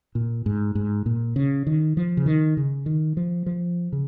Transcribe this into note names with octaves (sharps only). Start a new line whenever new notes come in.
A#2
G#2
G#2
A#2
C#3
D#3
F3
C#3
D#3
C#3
D#3
F3
F3
C#3